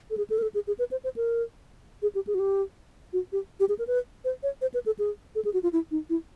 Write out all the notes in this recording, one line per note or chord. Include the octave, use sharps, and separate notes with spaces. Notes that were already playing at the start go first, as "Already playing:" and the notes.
A4
G#4
A4
A#4
A4
G#4
G#4
B4
C5
C5
A#4
G#4
G4
G#4
F#4
G4
F#4
G4
G4
G#4
A#4
B4
C5
C#5
C5
B4
A4
G#4
A4
G#4
F#4
F4
E4
D#4
E4